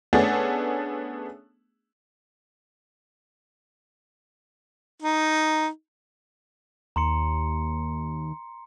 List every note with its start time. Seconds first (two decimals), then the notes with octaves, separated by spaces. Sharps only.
0.13 A3 B3 C#4 D4 G#4 A4
5.02 D#4
6.96 D#2 A#5 C6 C#7